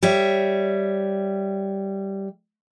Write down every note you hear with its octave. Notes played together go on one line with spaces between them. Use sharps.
G3 C#5 E5